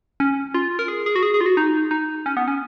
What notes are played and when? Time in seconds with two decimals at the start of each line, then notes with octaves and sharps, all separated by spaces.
0.20 C#4
0.54 F4
0.79 A#4
0.88 G#4
1.06 G#4
1.16 F#4
1.23 G#4
1.34 G#4
1.41 F4
1.46 F#4
1.57 D#4
1.91 D#4
2.26 C#4
2.37 B3
2.48 C#4